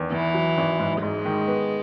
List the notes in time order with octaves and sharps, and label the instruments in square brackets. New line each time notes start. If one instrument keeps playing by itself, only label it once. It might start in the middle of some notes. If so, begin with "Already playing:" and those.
Already playing: [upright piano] E2 D#3
[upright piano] E2 [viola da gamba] E3
[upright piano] F#3
G#1
G#2
[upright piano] G#2 [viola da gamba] G#3
[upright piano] D#3
B3